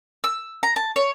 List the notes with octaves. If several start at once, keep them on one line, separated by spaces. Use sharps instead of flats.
E6
A#5
A5
C#5